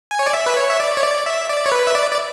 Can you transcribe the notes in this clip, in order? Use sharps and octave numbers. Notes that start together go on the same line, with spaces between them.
G#5
C#5
D5
E5
B4
C#5
E5
D5
C#5
D5
E5
D5
C#5
B4
E5
D5
D5